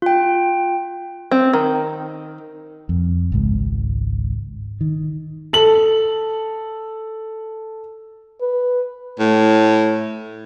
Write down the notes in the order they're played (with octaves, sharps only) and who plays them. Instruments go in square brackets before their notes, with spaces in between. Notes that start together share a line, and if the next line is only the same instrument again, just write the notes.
[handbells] F4 G5
[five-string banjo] C4
D#3
[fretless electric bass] F2
G#1 C#2 G#2
D#3
[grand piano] A4 F#7
[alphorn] B4
[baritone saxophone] A2